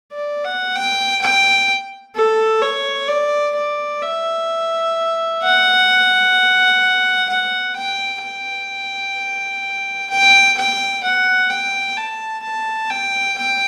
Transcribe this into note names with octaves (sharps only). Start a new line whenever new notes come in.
D5
F#5
G5
G5
A4
C#5
D5
D5
E5
F#5
F#5
G5
G5
G5
G5
F#5
G5
A5
A5
G5
G5